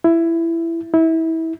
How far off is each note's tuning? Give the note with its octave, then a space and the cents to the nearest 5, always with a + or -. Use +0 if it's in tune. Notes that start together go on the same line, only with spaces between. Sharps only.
E4 +15
E4 -25